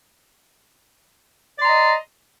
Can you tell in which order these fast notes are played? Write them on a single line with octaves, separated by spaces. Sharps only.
D5 C6 A#5 D#5